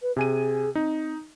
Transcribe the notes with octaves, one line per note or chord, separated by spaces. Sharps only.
B4
C3 G#4 G#5 D#7
C4 D#4